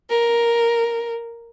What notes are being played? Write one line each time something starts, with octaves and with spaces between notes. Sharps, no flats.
A#4